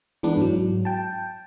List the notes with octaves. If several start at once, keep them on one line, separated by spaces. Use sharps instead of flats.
E3 G#3 B3 D4
G#2 F#3
G5 A5